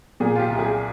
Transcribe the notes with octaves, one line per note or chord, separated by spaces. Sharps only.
A#2 G#4
F4
G4
C2
G#4